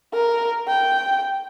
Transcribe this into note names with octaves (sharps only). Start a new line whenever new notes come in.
A#4
G5